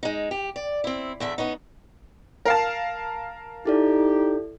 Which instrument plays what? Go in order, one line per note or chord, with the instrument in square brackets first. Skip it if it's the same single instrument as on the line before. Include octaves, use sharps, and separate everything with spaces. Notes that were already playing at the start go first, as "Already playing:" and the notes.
[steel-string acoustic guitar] G#3 D#4
G4
D5
C4 E4
E2 D3 E5
B3 C#4 D#4
[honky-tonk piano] A#4 F5 A5
[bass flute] D#4 [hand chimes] E4 A4 D5 [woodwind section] G4